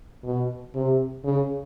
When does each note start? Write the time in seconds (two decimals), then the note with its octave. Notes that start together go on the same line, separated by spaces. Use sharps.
0.23 B2
0.75 C3
1.24 C#3